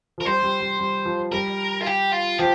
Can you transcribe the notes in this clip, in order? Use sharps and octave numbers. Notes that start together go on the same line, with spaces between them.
F3
A#4
G3 C5
G3
G3
G3
F3
G3 A#4
F4
G4
F4
F3 G4